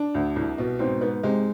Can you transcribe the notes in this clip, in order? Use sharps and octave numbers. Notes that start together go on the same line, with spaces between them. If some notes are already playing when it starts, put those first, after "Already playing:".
Already playing: D4
D2
C2
B2
G#2 C4
G#2 B3
C3 G#3